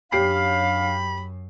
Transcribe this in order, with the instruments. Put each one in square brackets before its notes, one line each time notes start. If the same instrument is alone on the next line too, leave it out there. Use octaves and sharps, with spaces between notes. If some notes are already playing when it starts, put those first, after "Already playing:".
[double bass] F#2 [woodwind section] C#4 D4 F5 [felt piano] G4 C7 [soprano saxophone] B5